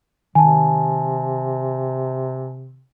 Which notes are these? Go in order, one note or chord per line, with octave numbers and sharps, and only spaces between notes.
C3 D#3 G#5 A5